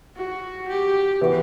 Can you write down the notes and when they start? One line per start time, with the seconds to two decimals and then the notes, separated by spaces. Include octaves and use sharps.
0.16 F#4
0.68 G4
1.21 E3 B3 F#4